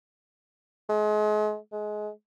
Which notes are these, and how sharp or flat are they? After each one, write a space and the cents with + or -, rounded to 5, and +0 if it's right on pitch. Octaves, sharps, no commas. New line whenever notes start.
G#3 +35
G#3 +25